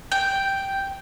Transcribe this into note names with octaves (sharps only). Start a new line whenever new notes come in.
G5